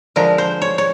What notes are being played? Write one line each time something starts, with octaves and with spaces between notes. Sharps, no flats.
D3 F3 G#3 A#4
C5
C#5
C#5